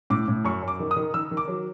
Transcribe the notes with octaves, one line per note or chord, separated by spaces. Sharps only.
A2 D6
A2
F#2 C#6
F#2
D6
D#3
D#6
D#3
D#3 E6
D#3
D6
F#3